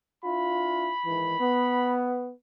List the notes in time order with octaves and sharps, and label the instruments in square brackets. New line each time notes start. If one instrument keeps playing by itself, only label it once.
[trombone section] D4 E4 F4 [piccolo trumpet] B5
[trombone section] G#2 D#3 E3
B3